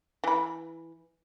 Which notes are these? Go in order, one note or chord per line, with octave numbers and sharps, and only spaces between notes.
E3 B5